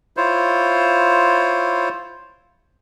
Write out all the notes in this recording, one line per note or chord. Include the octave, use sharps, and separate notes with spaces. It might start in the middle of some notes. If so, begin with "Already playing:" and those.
E4 F4 C5 C#5